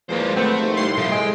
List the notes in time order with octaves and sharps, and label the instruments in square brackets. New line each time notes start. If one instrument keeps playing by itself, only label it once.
[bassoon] E2 [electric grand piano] F3 G#3 A#3 [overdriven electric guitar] F#3 C5
[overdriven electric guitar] A3 [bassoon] B3 [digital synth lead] C4
[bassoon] D#2 [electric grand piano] C6
[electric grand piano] C2 G3 E4 [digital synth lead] C6
[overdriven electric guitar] B2 F3 [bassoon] A3
[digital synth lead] G#3 [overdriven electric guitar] G5